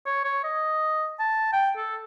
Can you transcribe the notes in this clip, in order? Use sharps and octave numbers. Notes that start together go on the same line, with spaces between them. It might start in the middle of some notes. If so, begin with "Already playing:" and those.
C#5
C#5
D#5
A5
G5
A4